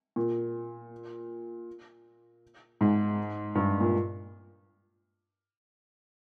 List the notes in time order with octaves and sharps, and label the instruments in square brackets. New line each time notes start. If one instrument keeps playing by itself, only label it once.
[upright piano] A#2
G#2
G2
A#2